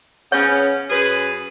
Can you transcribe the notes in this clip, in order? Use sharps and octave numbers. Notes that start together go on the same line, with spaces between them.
C#3 B3 C#4 C#5
F#2 G#4 B4